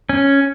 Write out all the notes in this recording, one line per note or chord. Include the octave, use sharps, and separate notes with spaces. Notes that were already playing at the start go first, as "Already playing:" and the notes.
C#4